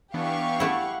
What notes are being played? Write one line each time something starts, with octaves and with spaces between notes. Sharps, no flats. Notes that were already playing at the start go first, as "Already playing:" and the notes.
E3 B3 D4 G4 F5 C#6
A3 E4 F#5